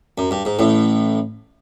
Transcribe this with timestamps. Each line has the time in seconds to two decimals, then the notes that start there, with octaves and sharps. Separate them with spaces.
0.18 F#2
0.31 G2
0.45 G#2
0.59 A1 A2